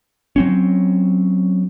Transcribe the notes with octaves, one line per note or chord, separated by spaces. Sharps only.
F#3 C4 C#4